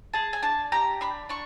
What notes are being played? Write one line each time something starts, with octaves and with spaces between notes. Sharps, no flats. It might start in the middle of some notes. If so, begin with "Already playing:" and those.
G#4 A5
G#5
D4 A5
G4 A#5
D4 B5
D4 C#6